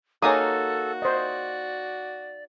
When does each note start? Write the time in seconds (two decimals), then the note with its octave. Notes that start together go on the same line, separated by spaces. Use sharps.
0.22 A#3 D#4 F#4 G#4 A4 C#5 A#5 D#6
1.02 C5 D5 D#5